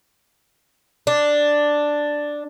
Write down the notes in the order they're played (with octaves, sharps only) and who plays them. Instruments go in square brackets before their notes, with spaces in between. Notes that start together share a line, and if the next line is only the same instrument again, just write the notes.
[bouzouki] D4